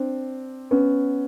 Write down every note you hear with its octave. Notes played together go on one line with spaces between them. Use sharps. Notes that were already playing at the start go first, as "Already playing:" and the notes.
Already playing: C4 D4
B3 C#4